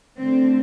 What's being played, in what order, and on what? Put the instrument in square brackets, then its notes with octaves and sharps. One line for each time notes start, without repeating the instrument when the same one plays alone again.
[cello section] D3 A3 C4